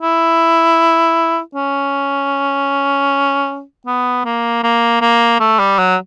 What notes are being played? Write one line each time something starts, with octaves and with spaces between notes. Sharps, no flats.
E4
C#4
B3
A#3
A#3
A#3
A3
G3
F#3